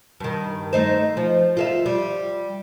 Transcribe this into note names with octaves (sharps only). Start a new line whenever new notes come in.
G2 D#3
A3 D#4 C5
F3
F4 A4 E5
G3